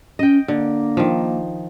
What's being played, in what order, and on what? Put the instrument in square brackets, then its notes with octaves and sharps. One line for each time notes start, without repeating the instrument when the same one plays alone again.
[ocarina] C#4 [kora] D#5 G5
[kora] D3 [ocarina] A#3
[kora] D#3 F3